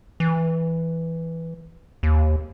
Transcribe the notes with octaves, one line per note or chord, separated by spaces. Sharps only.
E3
D#2